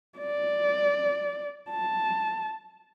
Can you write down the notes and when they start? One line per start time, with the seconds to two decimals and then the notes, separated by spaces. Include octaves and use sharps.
0.18 D5
1.70 A5